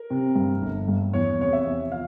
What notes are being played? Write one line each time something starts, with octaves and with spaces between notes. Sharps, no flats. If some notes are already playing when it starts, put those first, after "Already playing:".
Already playing: A#4
C3
G2
G1
G2
E2 C#5
C3 C#5
E5
E2
F3 F5